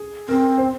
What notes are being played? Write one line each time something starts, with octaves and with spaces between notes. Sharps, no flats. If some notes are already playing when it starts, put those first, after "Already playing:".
Already playing: G#4
C4 A#4
C5